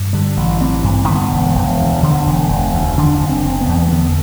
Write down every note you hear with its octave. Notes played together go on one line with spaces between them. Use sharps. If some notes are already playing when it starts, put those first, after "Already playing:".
Already playing: G2
D3 G3
A1
A1 C4
G2
D3 B3
E1
E1
D2
D3
E1
E1
D2
D3 D4
F#1
C4
F#1
B3
E2
A3
D3 B3